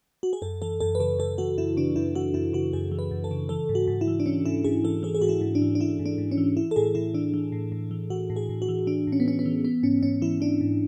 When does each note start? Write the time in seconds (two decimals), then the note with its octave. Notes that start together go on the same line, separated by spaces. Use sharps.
0.23 F#4
0.33 G#4
0.42 F#2 A4
0.62 E3 A4
0.81 F#2 A4
0.95 B4
1.00 C#3 A4
1.19 F#2 A4
1.38 E3 F#4
1.58 F#2 E4
1.77 C#3 D4
1.96 F#2 E4
2.15 E3 F#4
2.34 F#2 E4
2.53 C#3 F#4
2.73 F#2 G#4
2.92 E3
2.99 B4
3.11 F#2
3.24 A4
3.31 C#3
3.49 E3 A4
3.69 G#2
3.75 F#4
3.88 G#2
4.01 E4
4.08 E3
4.20 D4
4.26 E3 C#4
4.46 G#2 E4
4.64 G#2 G#4
4.84 E3 A4
5.03 E3 G#4
5.15 G#4
5.22 G#2 F#4
5.29 E4
5.41 G#2
5.55 D4
5.62 E3
5.75 D4
5.80 E3 E4
5.99 G#2
6.06 D4
6.18 G#2
6.32 C#4
6.38 E3
6.57 E3 E4
6.71 A4
6.76 A2 G#4
6.95 A2 E4
7.14 E3 D4
7.34 E3
7.52 A2
7.72 A2
7.91 E3
8.10 E3 F#4
8.30 A2
8.36 G#4
8.49 A2
8.62 F#4
8.68 E3
8.87 E3 D4
9.07 A2
9.12 C#4
9.20 B3
9.26 A2 C#4
9.39 B3
9.46 E3
9.64 E3 B3
9.83 G#2 C#4
10.03 G#2 C#4
10.22 E3 E4
10.40 E3 D4
10.61 G#2